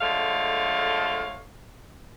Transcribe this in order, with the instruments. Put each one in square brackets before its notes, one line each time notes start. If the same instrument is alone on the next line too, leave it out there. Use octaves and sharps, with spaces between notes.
[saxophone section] D3 F3 G#3 A3 C#5 F5